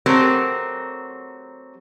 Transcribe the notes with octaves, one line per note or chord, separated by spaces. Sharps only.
F#3 A3 C4 G4 A#4